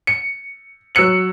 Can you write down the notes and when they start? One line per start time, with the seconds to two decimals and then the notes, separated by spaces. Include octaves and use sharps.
0.07 C#7
0.95 F#3 E6 F#6 C#7 F#7